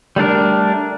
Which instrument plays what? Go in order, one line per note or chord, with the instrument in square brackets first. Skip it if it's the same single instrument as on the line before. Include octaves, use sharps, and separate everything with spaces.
[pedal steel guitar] G3 A3 D4 A#4